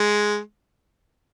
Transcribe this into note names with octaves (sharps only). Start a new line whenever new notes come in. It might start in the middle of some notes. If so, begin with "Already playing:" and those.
Already playing: G#3